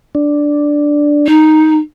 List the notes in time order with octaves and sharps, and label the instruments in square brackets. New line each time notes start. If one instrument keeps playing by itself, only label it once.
[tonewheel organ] D4
[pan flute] D#4